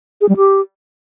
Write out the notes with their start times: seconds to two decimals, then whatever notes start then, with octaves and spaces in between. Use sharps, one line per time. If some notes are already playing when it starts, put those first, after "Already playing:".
0.21 G#4
0.29 G3
0.37 G4